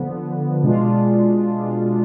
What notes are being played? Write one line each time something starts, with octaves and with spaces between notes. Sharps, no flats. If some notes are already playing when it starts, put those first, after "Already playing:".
Already playing: D3 F3 B3
B2 G#3 D4 F4